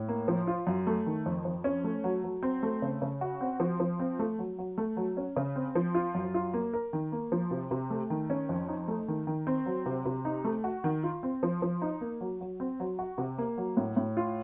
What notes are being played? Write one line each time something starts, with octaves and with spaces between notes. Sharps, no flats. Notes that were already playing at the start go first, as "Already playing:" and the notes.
Already playing: A2
A#3
F3
F4
F#2
A3
D#3
F2
F2
C#4
A3
F#3
F#3
C4
A3
C#3
C#3
F#4
C4
F3
F3
C4
A3
F#3
F#3
A3
F#3
C#4
C#3
C4
F3
F4
F#2
F4
A#3
A#4
D#3
A#3
F3
C3
C3
A3
D#3
C#4
F2
D#4
A3
D#3
D#3
C4
F#3
C3
C3
D#4
A3
F#4
D#3
F4
C4
F3
F3
D#4
A#3
F#3
F#3
C4
F#3
F#4
C3
A#3
F#3
A2
A2
F4